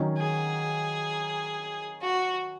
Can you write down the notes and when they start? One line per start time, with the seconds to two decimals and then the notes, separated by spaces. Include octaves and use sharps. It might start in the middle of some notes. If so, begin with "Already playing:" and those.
Already playing: D#3 F#3 C#4
0.18 G#4
2.02 F#4